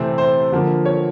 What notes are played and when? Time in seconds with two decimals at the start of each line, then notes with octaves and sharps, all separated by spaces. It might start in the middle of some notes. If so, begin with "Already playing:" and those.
Already playing: C3 E3 A3 C4
0.18 C5
0.52 D3 F3 A#3
0.86 C#5